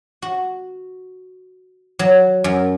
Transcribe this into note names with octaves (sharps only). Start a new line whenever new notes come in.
F#4
F#3
F#2